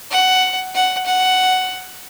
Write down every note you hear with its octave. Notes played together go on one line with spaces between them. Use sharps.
F#5
F#5
F#5